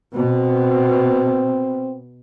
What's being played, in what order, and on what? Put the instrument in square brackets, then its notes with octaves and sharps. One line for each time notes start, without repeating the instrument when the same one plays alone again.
[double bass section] B2 [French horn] C4